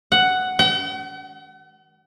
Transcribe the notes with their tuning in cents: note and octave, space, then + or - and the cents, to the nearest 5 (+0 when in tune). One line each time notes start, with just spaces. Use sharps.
F#5 +5
F#5 +45